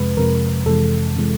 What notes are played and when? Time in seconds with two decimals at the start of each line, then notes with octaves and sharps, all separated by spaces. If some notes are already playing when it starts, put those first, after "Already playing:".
Already playing: F2 C3 F3 G#3 B4
0.17 F2 C3 F3 G#3 A#4
0.66 F2 C3 E3 G#3 A4
1.16 C3 E3 G#3